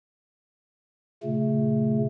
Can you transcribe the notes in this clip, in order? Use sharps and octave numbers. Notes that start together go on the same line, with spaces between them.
A#2 C#3 A3